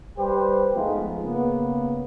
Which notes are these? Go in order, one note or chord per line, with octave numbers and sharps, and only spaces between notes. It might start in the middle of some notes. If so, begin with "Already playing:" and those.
G3 G4 B4 C5
F3 G#3 A3 B3 D#4 F4
C#3 A#3 B3